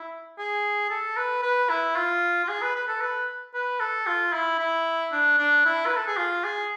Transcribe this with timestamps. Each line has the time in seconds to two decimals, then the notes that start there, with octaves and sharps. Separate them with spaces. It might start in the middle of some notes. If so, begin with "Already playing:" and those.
Already playing: E4
0.38 G#4
0.90 A4
1.17 B4
1.43 B4
1.69 E4
1.96 F4
2.44 F4
2.48 G#4
2.62 B4
2.75 B4
2.88 A4
3.01 B4
3.54 B4
3.80 A4
4.07 F4
4.33 E4
4.59 E4
5.12 D4
5.38 D4
5.65 E4
5.86 B4
5.97 A4
6.07 G#4
6.17 F4
6.44 G#4